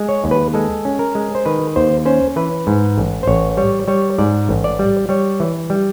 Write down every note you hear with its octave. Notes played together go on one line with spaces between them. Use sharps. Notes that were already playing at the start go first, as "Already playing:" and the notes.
Already playing: G#3
C#5
D#2
B4
G#3 A4
C#4
A#4
G#3
C5
D#3 B4
D#2 C5
C#4 C5
E3 B4
G#2
A1
C5
A1 C#5
G3 C#5
G3 C#5
G#2 D5
A1
D5
G3
G3 C#5
E3
G3